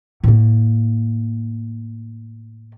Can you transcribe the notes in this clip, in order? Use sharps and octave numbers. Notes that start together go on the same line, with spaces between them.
A2 A#3